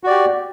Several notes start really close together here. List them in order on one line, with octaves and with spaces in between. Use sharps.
F#4 D5 G4